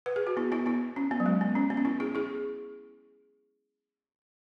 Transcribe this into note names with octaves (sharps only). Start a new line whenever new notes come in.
B4
G#4
F#4
B3 E4
B3 E4
B3 E4
C#4
B3
F#3
G#3
B3
C#4
B3
C#4
B3 E4
E4 G#4
E4 G#4